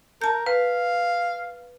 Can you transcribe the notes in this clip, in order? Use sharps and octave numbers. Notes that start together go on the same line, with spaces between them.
A#4 A5 G6
B4 F5